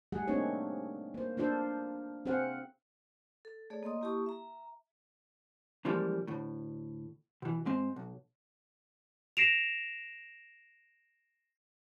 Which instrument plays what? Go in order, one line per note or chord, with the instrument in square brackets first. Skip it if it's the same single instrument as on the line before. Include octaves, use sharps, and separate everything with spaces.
[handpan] G3 A3 G#4 F#5
A3 A#3 C4 D4 D#4 C#5
A#3 C5
A#3 D4 F4 A4 C5
C4 G#4 C5 F5 F#5
[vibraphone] A4
A3 G#4 A4 C#5 D5
A#3 D#5 C6 D#6
A#3 E4 G4 A5 C#6 D#6
E5 A#5
[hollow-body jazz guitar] C#3 E3 F3 G3 G#3 A#3
D2 A2
B2 E3
G#2 G#3 C4
B1
[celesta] A#6 C7 D7 E7 F7